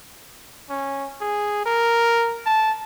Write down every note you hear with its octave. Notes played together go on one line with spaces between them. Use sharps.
C#4
G#4
A#4
A5